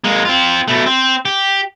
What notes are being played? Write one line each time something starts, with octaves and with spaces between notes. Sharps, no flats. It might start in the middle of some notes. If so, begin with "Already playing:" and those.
G#3 A#3
C4 F4
B2 A3
C4
G4